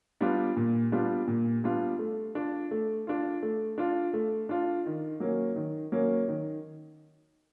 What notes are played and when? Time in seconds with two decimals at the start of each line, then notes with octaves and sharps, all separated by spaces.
0.21 G3 B3 D4 F4
0.56 A#2
0.92 G3 B3 D4 F4
1.28 A#2
1.64 G3 B3 D4 F4
1.99 A3
2.35 D4 F4
2.71 A3
3.07 D4 F4
3.42 A3
3.78 D4 F4
4.13 A3
4.49 D4 F4
4.86 D#3
5.20 F#3 A#3 C#4
5.56 D#3
5.92 F#3 A#3 C#4
6.28 D#3